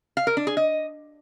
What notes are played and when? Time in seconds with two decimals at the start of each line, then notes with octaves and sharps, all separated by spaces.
0.17 F5
0.27 A#4
0.37 D4
0.47 G#4
0.57 D#5